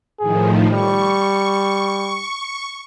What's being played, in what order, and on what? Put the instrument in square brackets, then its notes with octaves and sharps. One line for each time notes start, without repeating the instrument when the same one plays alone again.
[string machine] A2 D#3 F3 [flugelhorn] G#4
[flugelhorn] G3 [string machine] C#6